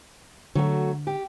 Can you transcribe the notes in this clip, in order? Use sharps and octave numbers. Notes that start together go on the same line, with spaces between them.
D3 F#3 A3 F#4
G4